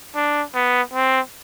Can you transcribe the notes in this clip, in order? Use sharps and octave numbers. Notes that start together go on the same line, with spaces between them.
D4
B3
C4